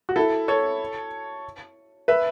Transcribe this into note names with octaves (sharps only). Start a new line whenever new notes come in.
F#4
E4 A4
A4 C#5
B4 E5